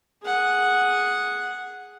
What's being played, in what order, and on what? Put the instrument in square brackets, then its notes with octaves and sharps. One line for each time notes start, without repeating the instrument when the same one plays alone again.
[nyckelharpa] G#4 F#5